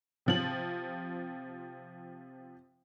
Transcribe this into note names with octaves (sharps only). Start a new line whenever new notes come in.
C3 F3 F#7